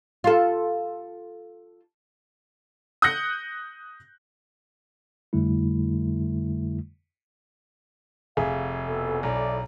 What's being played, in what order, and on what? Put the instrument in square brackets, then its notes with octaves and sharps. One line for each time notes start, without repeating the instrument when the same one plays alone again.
[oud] F4 A4
[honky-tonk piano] D#6 F#6 G6 A#6 C#7
[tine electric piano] F2 D3 G3 A3 E4
[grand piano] F1 E5 [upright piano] G#4 [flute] F5
[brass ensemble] F2 B2 [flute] A4
[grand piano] B1 [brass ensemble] E4 A4 D5 [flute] A#5